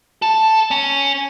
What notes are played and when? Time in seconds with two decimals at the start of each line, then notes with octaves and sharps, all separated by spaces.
0.22 A4
0.71 C#4